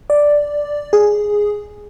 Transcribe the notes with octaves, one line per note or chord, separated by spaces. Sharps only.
D5
G#4